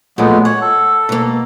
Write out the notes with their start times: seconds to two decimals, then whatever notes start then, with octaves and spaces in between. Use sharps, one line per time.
0.18 A#2 F3 F#3 G#3 A3 B3
0.45 C#5 F#5
0.62 A4
1.09 B2 A#3